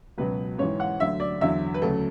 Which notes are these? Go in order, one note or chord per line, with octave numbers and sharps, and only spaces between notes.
C#2 B2 F#3 B4
G#2 E3 C#5
F#5
D2 D3 F#3 E5
D5
E2 D3 F#3 E5
B4
D2 C#3 F#3 A4